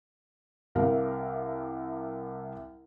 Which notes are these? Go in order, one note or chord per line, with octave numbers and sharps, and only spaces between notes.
C2 C3 A#4 F5